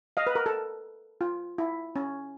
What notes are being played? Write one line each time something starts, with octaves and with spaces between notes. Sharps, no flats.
D#5 F5
B4
A#4
A4
F4
E4
C#4